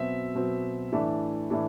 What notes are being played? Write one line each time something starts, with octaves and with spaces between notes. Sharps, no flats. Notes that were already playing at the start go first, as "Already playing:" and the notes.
Already playing: B2 F#3 C4 E5
B2 F#3 C4
A2 E3 A3 D4
A2 E3 A3 D4